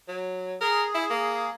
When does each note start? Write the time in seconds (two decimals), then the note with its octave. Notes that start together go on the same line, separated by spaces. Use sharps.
0.08 F#3
0.61 G#4 A#4
0.94 E4
1.10 A#3